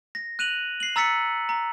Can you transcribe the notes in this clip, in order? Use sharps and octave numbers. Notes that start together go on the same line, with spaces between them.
A#6
F#6 D#7 F7 F#7
C7 F#7
A#5 E6 A6 B6 C#7
A#5